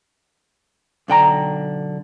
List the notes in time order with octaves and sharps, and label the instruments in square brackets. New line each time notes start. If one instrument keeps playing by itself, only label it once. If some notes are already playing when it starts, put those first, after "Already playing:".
[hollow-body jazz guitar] B1 D3 G5 A#5